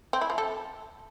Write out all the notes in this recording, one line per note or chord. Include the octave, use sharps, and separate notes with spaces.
C4
E4
F3
A4